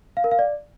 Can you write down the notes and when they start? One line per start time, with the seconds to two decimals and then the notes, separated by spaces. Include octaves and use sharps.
0.17 F5
0.24 A#4
0.31 F5
0.39 D5